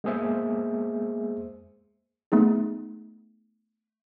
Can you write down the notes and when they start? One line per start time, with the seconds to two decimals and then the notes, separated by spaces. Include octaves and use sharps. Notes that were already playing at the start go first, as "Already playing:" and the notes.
0.04 G#3 A#3 B3 G#4 C5 E5
2.32 A3 B3 D#4 G#4